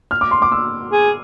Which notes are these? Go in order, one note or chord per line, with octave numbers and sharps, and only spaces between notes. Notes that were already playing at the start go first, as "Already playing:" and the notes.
F6
D6
C6
D6
E6
G#4